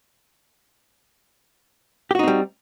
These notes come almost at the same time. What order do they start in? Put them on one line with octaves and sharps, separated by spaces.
G4 F#4 D#4 C4 G3